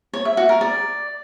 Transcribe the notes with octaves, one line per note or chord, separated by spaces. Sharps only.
C#5
E5
F#4
A#4
D5